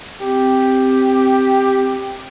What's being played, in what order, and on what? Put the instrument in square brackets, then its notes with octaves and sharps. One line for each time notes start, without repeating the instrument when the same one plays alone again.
[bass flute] C4 [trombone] G4